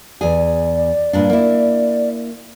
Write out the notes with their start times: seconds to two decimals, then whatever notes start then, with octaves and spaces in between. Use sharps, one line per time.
0.21 E2 G#4 D5
1.13 G2 A#2 D4
1.30 A#3 E4